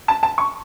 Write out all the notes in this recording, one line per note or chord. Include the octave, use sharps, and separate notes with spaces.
A5
A5
C#6